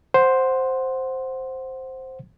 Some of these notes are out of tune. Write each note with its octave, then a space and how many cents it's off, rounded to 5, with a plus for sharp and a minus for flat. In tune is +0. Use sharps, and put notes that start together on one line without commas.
C5 +0 F#5 +0